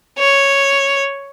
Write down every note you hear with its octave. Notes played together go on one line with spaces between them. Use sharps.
C#5